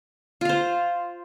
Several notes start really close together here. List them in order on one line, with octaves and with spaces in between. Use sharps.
F4 F5 C5